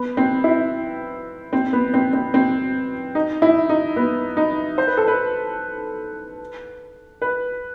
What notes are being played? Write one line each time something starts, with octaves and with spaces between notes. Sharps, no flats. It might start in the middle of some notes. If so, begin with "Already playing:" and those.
Already playing: B3
C4
E4
C4
B3
C4
C4
C4
D#4
E4
D#4
B3
D#4
C5
B4
A4
B4
B4